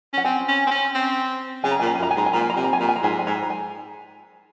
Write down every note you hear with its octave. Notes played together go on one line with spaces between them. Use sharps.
C#4 F#5
C4 G#5
C#4
C4
C#4
C4
C#3 G#5
A#5
A#2 G#5
A#5
G#5
F#2 A#5
G#5
G#2 A#5
G#5
A#2 A#5
G#5
A#5
C3 G#5
A#5
G#5
A#2 A#5
G#5
A#5
G#2 G#5
A#5
G#5
G#2 A#5
G#5
A#5
G#5